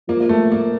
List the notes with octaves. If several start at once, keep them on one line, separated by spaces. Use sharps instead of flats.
F3 A#3
A#3
A3
A#3